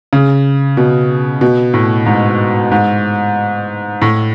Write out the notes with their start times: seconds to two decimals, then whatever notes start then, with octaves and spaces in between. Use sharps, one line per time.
0.13 C#3
0.77 B2
1.41 B2
1.74 A2
2.06 G#2
2.72 G#2
4.02 A2